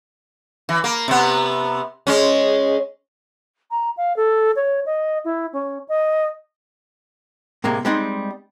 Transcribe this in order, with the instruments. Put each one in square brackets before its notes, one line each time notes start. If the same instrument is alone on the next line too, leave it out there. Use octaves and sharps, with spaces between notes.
[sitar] E3
A#3
C3 B3
G#3 C#4
[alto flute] A#5
F5
A4
C#5
D#5
E4
C#4
D#5
[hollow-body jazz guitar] A2 C3 G#3 A#3
G3 G#3 C4 D#4